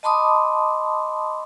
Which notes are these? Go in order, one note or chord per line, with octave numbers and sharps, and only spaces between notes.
D#5 A5 B5 C6 D6 D#6